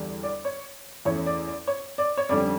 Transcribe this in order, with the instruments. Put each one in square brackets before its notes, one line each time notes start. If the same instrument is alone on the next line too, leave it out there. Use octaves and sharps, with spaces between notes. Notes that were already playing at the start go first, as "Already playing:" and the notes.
Already playing: [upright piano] E2 D3 G3 D4
D5
C#5
E2 E3 A3 C#4 C#5
D5
D5
C#5
D5
C#5
F2 D3 G3 C#4 D5